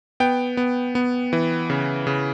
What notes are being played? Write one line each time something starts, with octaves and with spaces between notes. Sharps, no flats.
B3 G5
B3
B3
E3
C#3
C#3